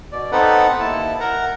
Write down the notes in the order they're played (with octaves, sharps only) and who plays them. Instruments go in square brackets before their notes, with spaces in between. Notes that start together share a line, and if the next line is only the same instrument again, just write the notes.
[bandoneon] B2 D5
B3 C4 D#4 A4 B4 F#5
D#2 E4 A5
A#4 F#5 A#5